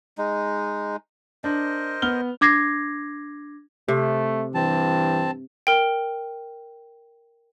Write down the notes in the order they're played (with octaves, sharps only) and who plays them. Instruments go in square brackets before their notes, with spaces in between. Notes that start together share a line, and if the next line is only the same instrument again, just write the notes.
[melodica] G#3 D#4
[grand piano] D4 [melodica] A#4 C5 D#5
[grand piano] B3 F6 G7
[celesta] D4 D6 G#6 A#6 C7
[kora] C3 [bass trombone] A3
[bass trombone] G2 [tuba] E3 [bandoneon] C4 A5
[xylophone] A#4 G5